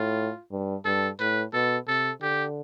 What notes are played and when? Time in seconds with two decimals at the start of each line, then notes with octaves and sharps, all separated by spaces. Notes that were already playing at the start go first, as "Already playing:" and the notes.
Already playing: A2 F4
0.51 G2
0.85 G2 A4
1.20 A2 B4
1.54 B2 A4
1.88 C3 A4
2.21 D3 G4